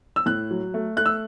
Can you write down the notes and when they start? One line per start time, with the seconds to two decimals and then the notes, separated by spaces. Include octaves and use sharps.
0.16 E6
0.26 A2 F#6
0.51 F#3
0.74 A3
0.97 A3 F#6
1.06 E6